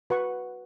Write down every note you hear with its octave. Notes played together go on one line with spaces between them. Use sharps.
F#4 B4 F#5 C#6